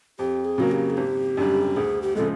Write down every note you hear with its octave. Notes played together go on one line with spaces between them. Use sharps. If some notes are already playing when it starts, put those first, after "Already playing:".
F2 G4
G#4
C#3 F#3 A#3 F#4
G4
G#4
G#1 G4
F#2 D3 G3
D2 G#4
G4
C#3 F3 G#3 A4